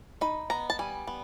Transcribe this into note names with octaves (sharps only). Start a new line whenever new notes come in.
D#4 B5
B3 A#5
A5
G3 G#5
B3